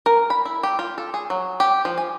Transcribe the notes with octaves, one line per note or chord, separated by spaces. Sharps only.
A#4
B5
E4
G4
F4
A4
G#4
F#3
G4
F3
G#5